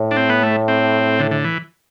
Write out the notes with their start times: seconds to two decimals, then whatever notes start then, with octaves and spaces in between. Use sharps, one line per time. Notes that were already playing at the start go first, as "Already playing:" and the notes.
Already playing: A2
0.11 D4
0.17 C4
0.29 B3
0.43 A3
0.68 C4
1.19 D3
1.31 D3
1.44 E3